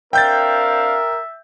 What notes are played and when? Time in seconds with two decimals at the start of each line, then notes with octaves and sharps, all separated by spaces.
0.13 C4 D4 A#4 E5 F5 G5 G6 A6